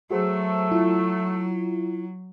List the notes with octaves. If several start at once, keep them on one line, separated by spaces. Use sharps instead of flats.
F#3 A3 F#4 G#4 C5
E4 F4